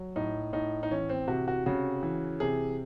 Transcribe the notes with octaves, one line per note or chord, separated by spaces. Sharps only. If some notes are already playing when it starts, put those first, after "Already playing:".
Already playing: F#3
A2 D#4
A2 D#4
D#4
E3 C#4
C4
C3 F#4
F#4
C#3 F#4
E3
C3 G#4